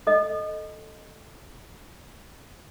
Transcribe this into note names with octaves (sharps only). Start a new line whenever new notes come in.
A4 D#5